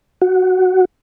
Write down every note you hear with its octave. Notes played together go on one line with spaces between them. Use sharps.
F#4